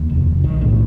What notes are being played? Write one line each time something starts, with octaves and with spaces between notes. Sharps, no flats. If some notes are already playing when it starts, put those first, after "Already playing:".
Already playing: D#2
F1
F1
B1 D#3
A2 D3